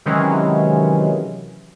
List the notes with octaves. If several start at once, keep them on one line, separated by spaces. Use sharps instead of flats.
C3 D#3 E3 F#3 G#3 C#4